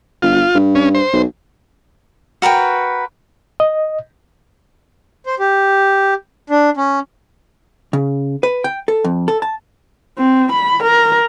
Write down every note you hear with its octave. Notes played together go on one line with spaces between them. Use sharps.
G1 F4
G2
C#4
C5
B1
F#4 A#4 B4 G5
D#5
C5
G4
D4
C#4
C#3
B4
G5
A4
F2
A4
A5
C4
B5
A#4